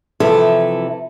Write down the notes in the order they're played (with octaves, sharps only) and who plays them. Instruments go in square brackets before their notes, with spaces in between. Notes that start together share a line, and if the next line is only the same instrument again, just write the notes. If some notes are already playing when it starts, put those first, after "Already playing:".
[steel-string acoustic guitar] C3 E3 F3 E4 A4